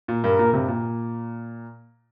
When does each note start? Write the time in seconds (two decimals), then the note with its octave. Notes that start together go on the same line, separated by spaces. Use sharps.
0.08 A#2
0.23 G2 A#4
0.39 A#2
0.53 G2 C3
0.68 A#2